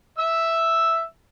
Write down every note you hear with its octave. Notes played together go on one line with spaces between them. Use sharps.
E5 E6